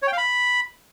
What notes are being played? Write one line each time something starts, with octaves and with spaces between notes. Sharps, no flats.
C#5
G5
F5
B5